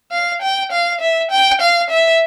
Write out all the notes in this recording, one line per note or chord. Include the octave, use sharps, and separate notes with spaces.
F5
G5
F5
E5
G5
F5
E5